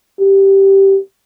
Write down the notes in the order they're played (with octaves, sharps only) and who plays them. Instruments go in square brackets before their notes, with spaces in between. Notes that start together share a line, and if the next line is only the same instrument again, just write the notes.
[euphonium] G4